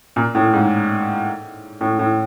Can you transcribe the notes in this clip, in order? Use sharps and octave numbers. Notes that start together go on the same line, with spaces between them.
A#2
A2
G#2
A2
A2